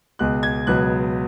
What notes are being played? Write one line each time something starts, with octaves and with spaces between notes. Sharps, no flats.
C#2 B2 G#3 F#6
G#6
C#2 B2 F#3 B3 F#6